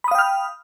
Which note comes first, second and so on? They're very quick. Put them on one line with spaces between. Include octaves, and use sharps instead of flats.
B5 D#6 F5 G5 F6